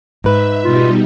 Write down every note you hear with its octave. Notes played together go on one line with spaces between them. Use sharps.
G#2 B4 E5
B2 G3 D#4 F4